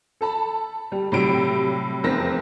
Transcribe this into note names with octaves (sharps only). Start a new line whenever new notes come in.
A4 A5 B5
G3
A2 C3 F#3 G3 D7
F1 E2 C4 A#4 A#6